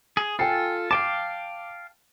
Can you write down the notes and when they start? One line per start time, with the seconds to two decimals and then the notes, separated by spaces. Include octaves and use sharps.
0.17 G#4
0.39 F4 A4 G5 G#5 C7
0.91 F5 G5 A5 D6